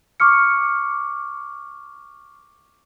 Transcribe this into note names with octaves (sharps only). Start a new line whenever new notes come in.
C#6 D6 F6 C#7